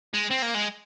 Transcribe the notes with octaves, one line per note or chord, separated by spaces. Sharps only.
G#3
C4
A#3
G#3